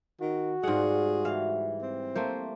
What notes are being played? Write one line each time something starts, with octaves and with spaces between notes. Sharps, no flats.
D#3 F#4
G#2 G3 F4 G#4 F#5
E3 F5
C4
A3 A#3 C5